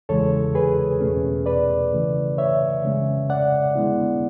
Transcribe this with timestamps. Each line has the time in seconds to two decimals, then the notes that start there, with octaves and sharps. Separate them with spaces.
0.09 E2 C#3 E3 G#3 A4 C#5
0.55 G#4 B4
1.01 E2 B2 A3 C#4
1.46 B4 D5
1.93 C#3 E3 A3
2.38 C#5 E5
2.84 C#3 G#3 C#4
3.30 D5 F#5
3.75 D3 G#3 B3 E4